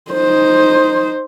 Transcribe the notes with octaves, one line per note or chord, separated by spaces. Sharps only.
D#4 C5